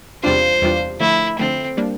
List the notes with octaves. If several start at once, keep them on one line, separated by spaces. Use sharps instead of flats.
E2 C3 G3 D4 F4 C5
E2 C3 G3 D4 F4
D3 F3 A3 E4
D3 F3 A3 C4
G3 A#3 D4